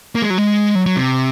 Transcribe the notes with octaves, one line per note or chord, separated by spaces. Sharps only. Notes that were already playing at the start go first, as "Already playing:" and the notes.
A#3
G#3
F#3
G#3
F#3
F#3
C3